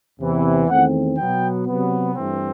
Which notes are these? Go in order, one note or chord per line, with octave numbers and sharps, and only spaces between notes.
E2 C3 E3
E2 D#3 A3 C4 F#5
B2 F#3 B3 G5
C3 F#3 B3
G2 E3 A3 C4